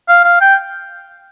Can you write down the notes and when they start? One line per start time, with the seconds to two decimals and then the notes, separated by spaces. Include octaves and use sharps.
0.08 F5
0.24 F5
0.41 G5